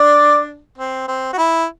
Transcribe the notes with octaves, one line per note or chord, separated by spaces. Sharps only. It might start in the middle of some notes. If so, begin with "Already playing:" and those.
Already playing: D4 D5
C4
C4
F#4
E4